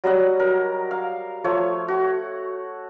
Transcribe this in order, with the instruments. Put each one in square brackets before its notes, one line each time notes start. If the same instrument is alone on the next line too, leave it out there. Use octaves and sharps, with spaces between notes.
[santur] F#3 G3 D#5 F#5
A#4
F5
F3 A3 C#5
F#4